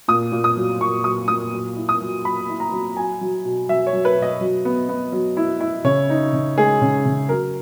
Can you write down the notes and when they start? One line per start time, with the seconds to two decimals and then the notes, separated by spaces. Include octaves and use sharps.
0.08 A#2 D#6
0.32 A#2
0.44 D#6
0.57 F#3
0.80 A#2 C#6
1.04 F#3 D#6
1.28 A#2 D#6
1.52 F#3
1.77 E4
1.89 D#6
2.01 F#3
2.24 F#3 B5
2.49 E4
2.60 A#5
2.72 F#3
2.96 F#3 G#5
3.21 F#3
3.45 B2
3.69 F#3 E5
3.87 C#5
3.93 F#3
4.05 B4
4.17 B2
4.22 D#5
4.41 F#3
4.65 B3
4.89 B3
5.12 F#3
5.37 E4
5.60 E4
5.84 C#3 C#5
6.10 D#4
6.33 C#3
6.58 G#3 G#4
6.82 C#3
7.06 C#3
7.29 F#3 A#4